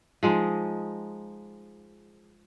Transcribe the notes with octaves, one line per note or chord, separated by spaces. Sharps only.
F3 G#3 D#4